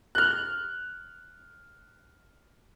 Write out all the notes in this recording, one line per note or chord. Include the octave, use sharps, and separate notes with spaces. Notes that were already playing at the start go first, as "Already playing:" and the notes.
F6 F#6